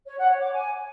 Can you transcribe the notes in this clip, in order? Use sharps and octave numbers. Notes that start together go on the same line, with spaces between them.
C#5
F#5
C#5
D6
G#5